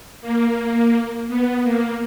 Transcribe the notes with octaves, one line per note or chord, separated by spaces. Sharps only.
A#3
B3
A#3